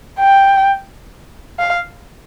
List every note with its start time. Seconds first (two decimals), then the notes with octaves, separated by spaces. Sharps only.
0.20 G5
1.59 F5